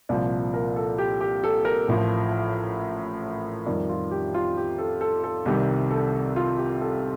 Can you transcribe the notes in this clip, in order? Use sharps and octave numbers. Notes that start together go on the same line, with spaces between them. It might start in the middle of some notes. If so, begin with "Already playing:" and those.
C2 A#2 F3 D5
A#4
A4
G4
G4
A4
A#4
A1 A2 F3
F2 D#3 G3 D5
F4
G4
F4
G4
A4
A4
A4
C2 C3 D#3 G3 G4
A4
F4
G4
A4